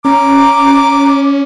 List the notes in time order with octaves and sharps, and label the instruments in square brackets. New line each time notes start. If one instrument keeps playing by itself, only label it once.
[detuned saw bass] C#4 [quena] A#5 [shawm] D6